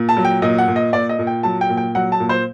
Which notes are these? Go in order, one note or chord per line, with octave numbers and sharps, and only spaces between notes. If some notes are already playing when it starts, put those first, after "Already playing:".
Already playing: A#2
A5
F#3
G5
A#2 D#5
F#5
A#2
D#5
A#2 D5
D#5
A#2
G5
F#3 A5
G5
A#2
G5
F#3 F#5
A5
A#2
C5